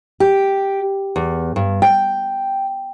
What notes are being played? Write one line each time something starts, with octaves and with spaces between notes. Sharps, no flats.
G4
E2
G2
G5